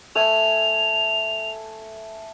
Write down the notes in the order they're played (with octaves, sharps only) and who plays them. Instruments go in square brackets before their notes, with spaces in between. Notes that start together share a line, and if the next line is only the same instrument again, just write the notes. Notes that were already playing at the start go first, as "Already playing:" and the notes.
[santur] A3 G#5 [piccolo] F7